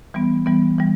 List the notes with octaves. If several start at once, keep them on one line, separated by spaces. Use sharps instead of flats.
E3 G3 B3
E3 G3 B3
E3 G3